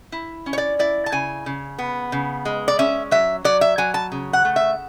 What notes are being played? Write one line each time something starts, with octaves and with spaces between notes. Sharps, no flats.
E4
C#4
C#5
D5
E4 D5
A5
C#3 G#5
C#3
B3
C#3
G#3
D5
C#4 E5
F#3 E5
F#3 D5
E5
F#3 G#5
A5
C#3
F#5
A3
E5